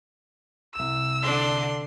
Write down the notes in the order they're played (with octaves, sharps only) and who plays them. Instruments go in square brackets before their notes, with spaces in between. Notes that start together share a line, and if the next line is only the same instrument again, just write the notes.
[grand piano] C2 E7 [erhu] E6
[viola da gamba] D3 D4 [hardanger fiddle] C6